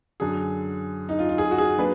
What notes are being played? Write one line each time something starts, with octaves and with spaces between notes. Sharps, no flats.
F#2 D3 F#3 G#4
D#4
F4
F4
G#4
F#4
G#4
F#3 A#3 D4 B4